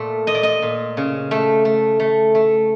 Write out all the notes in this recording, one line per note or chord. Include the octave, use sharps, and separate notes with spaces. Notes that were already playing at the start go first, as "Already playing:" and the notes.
Already playing: A#2 A3
A#2 D#5
D5
D#5
A#2
C#3
A3
A3
A3
A3